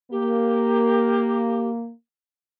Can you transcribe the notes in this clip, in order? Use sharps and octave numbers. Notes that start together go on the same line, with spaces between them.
A#3 G4